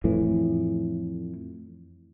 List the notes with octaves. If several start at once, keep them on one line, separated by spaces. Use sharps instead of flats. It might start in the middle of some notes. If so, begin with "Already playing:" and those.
F2 A2 E3